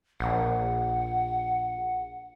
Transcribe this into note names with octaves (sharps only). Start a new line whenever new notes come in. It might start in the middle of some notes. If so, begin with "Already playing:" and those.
A#1 F#5